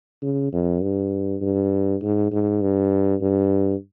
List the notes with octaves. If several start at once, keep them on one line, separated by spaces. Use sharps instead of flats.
C#3
F2
G2
G2
G#2
G#2
G2
G2